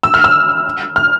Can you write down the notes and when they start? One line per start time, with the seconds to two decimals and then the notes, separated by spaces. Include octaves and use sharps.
0.03 E6
0.14 F6
0.24 E6
0.96 F6